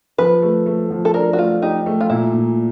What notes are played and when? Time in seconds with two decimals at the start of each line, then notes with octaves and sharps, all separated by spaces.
0.18 F3 B4
0.42 A3
0.66 A3
0.90 F3
1.05 A4
1.14 D4 A#4
1.33 F#4
1.38 A3 F4
1.62 D#4 G4
1.86 A3
2.01 F4
2.10 A#2 E4
2.34 A#2